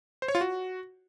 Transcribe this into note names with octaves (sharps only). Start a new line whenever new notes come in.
C5
C#5
F4
F#4